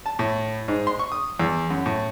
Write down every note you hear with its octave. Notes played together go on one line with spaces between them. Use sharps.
A5
A2
G#2
C6
C#6
D#6
E2
F#2
A2